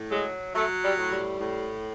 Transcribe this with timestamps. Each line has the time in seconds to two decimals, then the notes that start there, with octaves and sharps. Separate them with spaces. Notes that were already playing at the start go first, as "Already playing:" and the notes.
Already playing: A2
0.11 F#3 G#3
0.54 F#3 A3
0.83 G3
0.97 A2
1.11 G3
1.40 A2